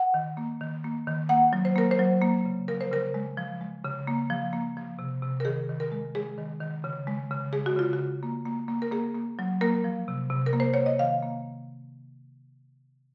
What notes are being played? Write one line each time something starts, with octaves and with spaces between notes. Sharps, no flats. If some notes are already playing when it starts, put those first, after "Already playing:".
Already playing: F#5
D#3
A#3
D#3
A#3
D#3
A#3 F#5
F#3
C5
A#3 A#4
C5
F#3
A#3
C#3
F3 A#4
C5
C#3 A#4
G#3
F3
G#3
C#3
A#3
F3
A#3
F3
C3
C3
A#4
D#3 G#4
D#3
A#4
G#3
G#3 G#4
D#3
D#3
C#3
G#3
C#3
G#3 G#4
F#4
C#3 F4
F#4
C#3
A#3
A#3
A#3
A#4
A#3 G#4
A#3
F#3
A#3 A#4
F3
C3
C3
A#4
A#3
C5
A#3 C#5
D#5
D#3 F5
A#3